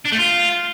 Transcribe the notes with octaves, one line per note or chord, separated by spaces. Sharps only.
D4
A3
F4